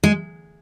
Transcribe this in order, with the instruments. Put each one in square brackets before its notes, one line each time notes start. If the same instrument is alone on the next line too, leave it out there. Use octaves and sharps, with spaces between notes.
[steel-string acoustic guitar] G#3